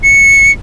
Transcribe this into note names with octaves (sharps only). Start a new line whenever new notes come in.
C#7